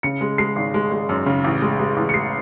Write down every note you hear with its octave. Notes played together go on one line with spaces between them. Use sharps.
C#3 C#7
G#3
G#3 C7
G#1
G#3
G#3
F#2
C#3
A1
G#3
G#3
A1
C#7
G#3 C7